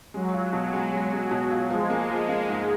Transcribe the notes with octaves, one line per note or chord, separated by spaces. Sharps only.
F#3 G#3
F4
B2
G#3
G#3
G#3
B2
F4
F3 G#3
A#3
F3
A#3
G#2